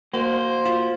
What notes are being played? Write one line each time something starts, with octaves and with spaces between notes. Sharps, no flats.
A#3 F#4 C5
F4